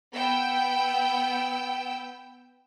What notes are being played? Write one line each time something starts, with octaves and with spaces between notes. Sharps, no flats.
B3 G5 E6